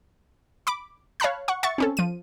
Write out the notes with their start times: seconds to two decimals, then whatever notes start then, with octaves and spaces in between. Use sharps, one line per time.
0.67 B5 D6
1.20 C#5 F5 A5 B5 F#6
1.48 F#5 C#6
1.63 E5 F#5 C#6 A6 C#7
1.78 C4 C#4 A4
1.97 F3 D#7